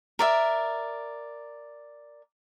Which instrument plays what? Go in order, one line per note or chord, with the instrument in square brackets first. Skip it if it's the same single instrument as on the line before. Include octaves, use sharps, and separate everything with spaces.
[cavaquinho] A#4 D5 E5